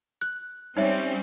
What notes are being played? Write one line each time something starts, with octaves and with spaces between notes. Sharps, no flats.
F#6
G3 C4 C#4 D#4 C#5 E5